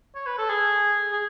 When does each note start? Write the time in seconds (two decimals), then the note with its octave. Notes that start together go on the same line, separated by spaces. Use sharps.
0.15 C#5
0.26 B4
0.38 A4
0.50 G#4
1.12 G#4